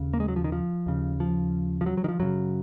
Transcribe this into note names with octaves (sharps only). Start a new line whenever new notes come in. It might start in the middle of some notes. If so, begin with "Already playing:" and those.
Already playing: D#2 C#3
A#3
G#3
F#3
F3
D#3
F3
D#2 C#3
F3
F3
F#3
F#3
D#3
F3
F#2 C#3 F#3